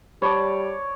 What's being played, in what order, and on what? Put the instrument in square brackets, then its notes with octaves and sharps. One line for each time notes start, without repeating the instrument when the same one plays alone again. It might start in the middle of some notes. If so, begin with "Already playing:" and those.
[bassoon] G3 [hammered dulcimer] C#5 D5 [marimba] A5 B5